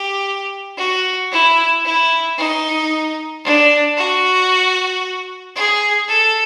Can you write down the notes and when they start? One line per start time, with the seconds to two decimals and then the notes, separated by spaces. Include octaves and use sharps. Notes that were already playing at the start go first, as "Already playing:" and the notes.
Already playing: G4
0.77 F#4
1.31 E4
1.84 E4
2.38 D#4
3.44 D4
3.97 F#4
5.55 G#4
6.08 A4